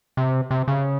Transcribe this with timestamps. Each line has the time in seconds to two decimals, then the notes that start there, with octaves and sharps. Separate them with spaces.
0.17 C3
0.51 C3
0.68 C#3